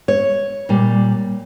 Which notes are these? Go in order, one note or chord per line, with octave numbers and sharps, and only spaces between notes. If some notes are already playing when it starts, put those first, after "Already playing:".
C#5
A#2 G3